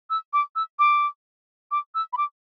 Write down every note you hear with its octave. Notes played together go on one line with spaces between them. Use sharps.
E6
D6
E6
D6
D6
E6
B5
D6